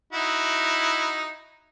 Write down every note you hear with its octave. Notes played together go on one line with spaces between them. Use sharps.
D#4 E4 F#4